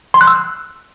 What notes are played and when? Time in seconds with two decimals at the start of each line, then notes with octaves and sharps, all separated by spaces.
0.14 C6
0.21 F#6
0.27 E6